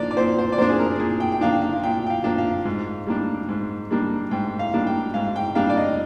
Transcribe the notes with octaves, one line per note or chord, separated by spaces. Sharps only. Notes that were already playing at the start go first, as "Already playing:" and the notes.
Already playing: F3 A#3 D4 D5
D5
A#2 C5
C5
D5
F3 A#3 D4 C5
G#4
A#4
A#2 G#4
G5
G5
F3 A#3 D4 F5
F5
A#2 G5
G5
F5
F3 A#3 D4
F5
G#2
G3 A#3 D4
G#2
G3 A#3 D4
G#2 G5
F5
G3 A#3 D4
G5
G#2 F5
G5
G3 A#3 D4 F5
D5
D#5